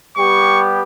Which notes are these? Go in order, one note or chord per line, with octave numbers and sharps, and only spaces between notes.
G3 B3 G4 C#6